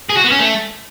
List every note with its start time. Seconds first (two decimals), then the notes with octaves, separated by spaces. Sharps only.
0.10 G#4
0.17 F#4
0.25 B3
0.32 C#4
0.39 A3